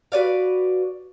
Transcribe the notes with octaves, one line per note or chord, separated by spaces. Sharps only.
F#4 B4 D5 F5